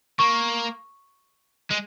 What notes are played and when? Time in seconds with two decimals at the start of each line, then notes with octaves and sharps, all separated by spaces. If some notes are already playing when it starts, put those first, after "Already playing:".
0.19 A#3 C#6
1.71 G#3